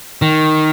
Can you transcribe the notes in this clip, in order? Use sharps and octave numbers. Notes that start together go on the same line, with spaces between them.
D#3